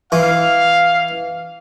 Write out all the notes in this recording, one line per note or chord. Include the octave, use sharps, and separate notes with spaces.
E3 F5